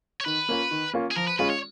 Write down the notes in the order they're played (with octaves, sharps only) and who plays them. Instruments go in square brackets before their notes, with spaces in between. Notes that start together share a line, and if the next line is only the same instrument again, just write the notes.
[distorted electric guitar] C#5
[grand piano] D#3 [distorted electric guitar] B4
[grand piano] A#3 C#4 F4
D#3
A#3 C#4 F4
[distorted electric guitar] G#4
[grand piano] F3 [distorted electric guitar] A#4
[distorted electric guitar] B4
[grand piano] G#3 C#4 F4 [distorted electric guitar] B4
[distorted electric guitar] C#5